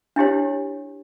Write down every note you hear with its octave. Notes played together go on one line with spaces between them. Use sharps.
D4 E4 G4 C#5